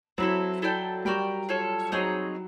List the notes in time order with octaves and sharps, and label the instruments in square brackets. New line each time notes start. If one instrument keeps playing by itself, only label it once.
[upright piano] F#3 [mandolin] C4 E4 A4
[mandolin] E4 A4 D5 G5
[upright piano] G3 [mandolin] F#4 A#4 D5 G5
[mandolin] F4 A4 C#5
[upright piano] F#3 [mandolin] C4 D#4 G#4 C#5